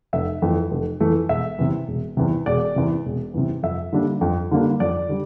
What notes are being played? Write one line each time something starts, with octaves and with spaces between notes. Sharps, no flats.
F1 E5
F2 E3 A3
F1
F2 E3 A3
E1 E5
E2 C3
E1
E2 C3
E1 D5
E2 C3
E1
E2 C3
F2 E5
D3 G3 A#3 D4
F2
D3 G3 A#3 D4
F2 D5
D3 G3